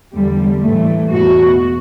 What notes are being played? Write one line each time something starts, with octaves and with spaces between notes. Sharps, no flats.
E2 D3 G3
A2 E3 A3
E2 B2 F#4